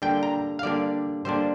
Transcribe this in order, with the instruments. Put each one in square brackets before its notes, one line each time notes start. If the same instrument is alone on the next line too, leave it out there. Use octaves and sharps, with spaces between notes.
[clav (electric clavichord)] D3 G3 A#3 D4 G5
A#5
F5
D3 G3 A#3 D4 D5
D3 G3 A#3 D4 C5